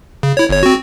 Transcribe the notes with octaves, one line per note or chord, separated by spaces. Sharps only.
C#3
E4 C#5
G1 C#5
C4 F#4